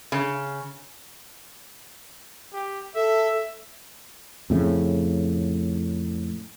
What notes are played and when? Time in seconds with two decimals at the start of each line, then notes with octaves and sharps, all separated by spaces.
0.12 C#3
2.52 G4
2.95 A4 E5
4.50 F2 A2 C#3